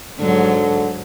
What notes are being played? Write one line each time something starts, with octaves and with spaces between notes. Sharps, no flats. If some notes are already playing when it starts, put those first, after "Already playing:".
G#2 D3 F#3